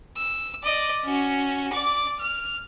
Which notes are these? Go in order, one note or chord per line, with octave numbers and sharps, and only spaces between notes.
E6
D5 D#5
C#4 F#4
D5 D6
F6